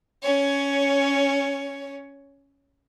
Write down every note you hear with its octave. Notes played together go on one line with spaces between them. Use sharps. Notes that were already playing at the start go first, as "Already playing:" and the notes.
C#4 C#5